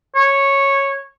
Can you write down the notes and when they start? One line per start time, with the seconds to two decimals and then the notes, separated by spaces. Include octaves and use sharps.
0.16 C#5